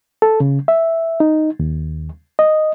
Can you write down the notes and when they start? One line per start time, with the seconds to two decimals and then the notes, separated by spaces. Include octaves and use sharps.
0.22 A4
0.40 C#3
0.68 E5
1.20 D#4
1.60 D#2
2.39 D#5